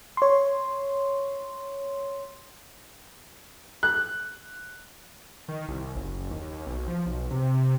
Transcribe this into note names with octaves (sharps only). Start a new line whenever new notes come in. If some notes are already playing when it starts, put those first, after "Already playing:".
C#5 C6
F#6
D#3
C2
F#1
D#2
B1
F3
B1
C3